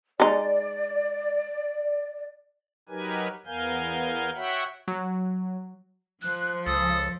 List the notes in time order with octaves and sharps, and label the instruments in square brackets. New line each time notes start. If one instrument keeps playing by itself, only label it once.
[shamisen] G#3 D#4 [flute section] D5
[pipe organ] F#3 D#4 G4 A#4 B4 G#5
E2 B3 A#4 F5 G#5 G6
F#4 C#5 E5 F#5 G5 B5
[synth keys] F#3
[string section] F3 [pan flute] F#6
[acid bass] C#2 [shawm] A4 [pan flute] D#6